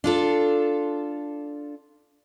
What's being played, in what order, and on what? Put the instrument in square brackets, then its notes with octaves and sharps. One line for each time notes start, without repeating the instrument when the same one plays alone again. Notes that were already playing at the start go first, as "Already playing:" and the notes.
[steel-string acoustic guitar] D4 F4 A4